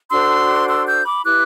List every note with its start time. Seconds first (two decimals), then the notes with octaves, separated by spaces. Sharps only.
0.11 D4 F#4 A4 C5 C6 E6
0.68 C6 E6
0.86 E6 G6
1.05 B5 D6
1.24 E4 G4 B4 D6 F#6